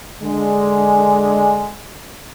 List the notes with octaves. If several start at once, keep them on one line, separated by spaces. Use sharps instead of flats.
D3 G#3